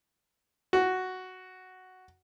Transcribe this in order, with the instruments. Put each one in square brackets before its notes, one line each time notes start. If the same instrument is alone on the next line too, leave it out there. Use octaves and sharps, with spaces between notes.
[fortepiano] F#4